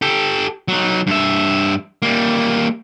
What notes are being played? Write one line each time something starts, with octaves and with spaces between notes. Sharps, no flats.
G4 A4
F#3 D#4
G2 E5
G3 A#3